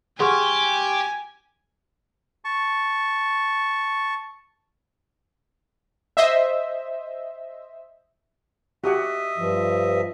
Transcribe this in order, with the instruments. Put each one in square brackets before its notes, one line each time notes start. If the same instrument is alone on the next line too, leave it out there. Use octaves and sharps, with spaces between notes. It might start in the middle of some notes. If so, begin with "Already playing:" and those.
[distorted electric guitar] G4 [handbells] G#4 F#5 [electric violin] G#5 [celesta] C6 C#6 F6
[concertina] A5 C#6
[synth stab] C5 D#5 E5
[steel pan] F#4 G4 F#5 [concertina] D#5 E5
[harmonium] G2 F3